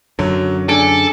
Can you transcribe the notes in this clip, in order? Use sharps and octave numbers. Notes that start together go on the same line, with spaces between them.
F#2 D3 F#3
D4 G#4 A4 D7